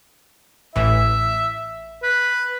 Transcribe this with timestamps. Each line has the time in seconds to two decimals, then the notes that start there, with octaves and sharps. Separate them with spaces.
0.76 A1 E3 E5
2.03 B4